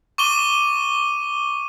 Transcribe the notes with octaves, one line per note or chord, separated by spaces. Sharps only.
C#6 D6 D#7 G7